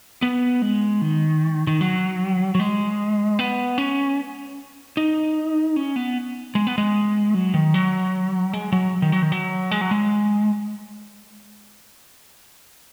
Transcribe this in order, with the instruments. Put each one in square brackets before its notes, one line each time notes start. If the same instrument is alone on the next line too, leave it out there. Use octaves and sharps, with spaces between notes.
[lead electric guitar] B3
G#3
D#3
D#3
F#3
F#3
G#3
B3
C#4
D#4
C#4
B3
G#3
B3
G#3
F#3
D#3
F#3
G#3
F#3
D#3
F#3
D#3
F#3
G#3
F#3
G#3